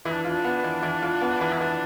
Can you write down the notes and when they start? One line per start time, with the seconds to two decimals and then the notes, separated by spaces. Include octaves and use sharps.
0.05 E3 E4
0.13 D4
0.25 D4 F4
0.45 B3
0.64 E3
0.83 E3
1.02 F4
1.21 B3
1.41 E3
1.53 E4
1.60 E3 D4